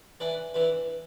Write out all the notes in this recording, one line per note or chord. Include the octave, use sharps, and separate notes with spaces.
E3 D4 B4
E3 D4 B4